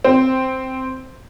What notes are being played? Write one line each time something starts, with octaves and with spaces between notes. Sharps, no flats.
C4